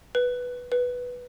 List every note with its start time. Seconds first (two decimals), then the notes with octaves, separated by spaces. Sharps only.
0.15 B4
0.72 B4